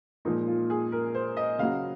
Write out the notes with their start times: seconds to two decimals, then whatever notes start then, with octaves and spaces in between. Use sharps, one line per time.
0.25 A#2 F3 G#3 D#4
0.47 F4
0.70 G#4
0.92 A#4
1.15 C5
1.37 D#5
1.59 C#3 F#3 F5